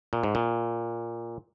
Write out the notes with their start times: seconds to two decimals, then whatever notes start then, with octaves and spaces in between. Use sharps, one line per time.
0.13 A#2
0.23 G#2
0.35 A#2